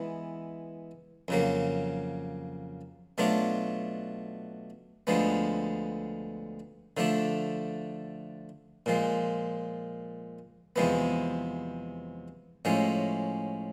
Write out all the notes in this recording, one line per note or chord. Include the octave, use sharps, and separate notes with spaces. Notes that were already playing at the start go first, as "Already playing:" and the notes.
Already playing: E3 G#3 B3 E4
F2 C#3 F#3 A#3
B2 F#3 A3 D4 F4
D2 D3 F3 G#3 B3
D3 F3 A3 D4
A#2 F3 G#3
E2 C3 F3 G#3 B3
A2 F3 G#3 C#4